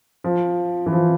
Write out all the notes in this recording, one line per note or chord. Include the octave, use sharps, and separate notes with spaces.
F3
E3
F3